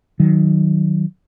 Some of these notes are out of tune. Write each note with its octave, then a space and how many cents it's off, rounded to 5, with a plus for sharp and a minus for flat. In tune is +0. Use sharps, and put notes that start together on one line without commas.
D#3 +0 F#3 +0